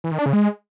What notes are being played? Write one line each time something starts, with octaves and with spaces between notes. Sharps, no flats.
E3
D#3
D4
C#3
G#3